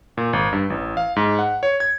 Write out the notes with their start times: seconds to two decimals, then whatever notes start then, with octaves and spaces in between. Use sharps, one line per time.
0.17 A#2
0.33 G#1
0.53 G2
0.70 A1
0.97 F5
1.16 G#2
1.39 F#5
1.63 C#5
1.80 G#6